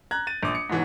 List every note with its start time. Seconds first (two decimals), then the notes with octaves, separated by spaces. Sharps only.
0.11 A#5 F#6 G#6
0.27 A6 D#7
0.43 A#1 D6 D#6
0.55 C#7
0.69 G#2 B2 E3 F#3